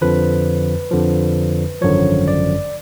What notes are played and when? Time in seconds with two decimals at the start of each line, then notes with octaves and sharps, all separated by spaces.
0.01 F2 D3 F3 B4
0.91 F2 D3 F3
1.82 G#1 F#2 D3 F3 C#5
2.28 D5